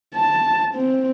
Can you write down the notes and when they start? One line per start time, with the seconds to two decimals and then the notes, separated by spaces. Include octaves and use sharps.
0.15 A5
0.74 C4